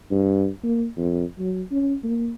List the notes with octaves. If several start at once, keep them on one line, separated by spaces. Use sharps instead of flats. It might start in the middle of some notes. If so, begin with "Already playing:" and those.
G2
A#3
F2
F#3
C#4
A#3